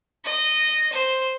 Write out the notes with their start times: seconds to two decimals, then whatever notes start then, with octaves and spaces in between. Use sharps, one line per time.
0.24 D#5
0.92 C5